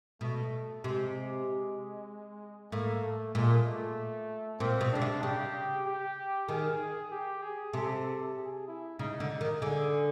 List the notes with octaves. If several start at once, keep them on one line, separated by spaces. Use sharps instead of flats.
B2 A3
C3 G#3
A2 A#3
A3
A#2 G#3
A3
A#2 C4
B2
C#3 D4
C3
C#3 G4
G4
D#3 G#4
G4
G#4
C3 A4
G#4
E4
C#3 D#4
D3
D#3
D3 G#4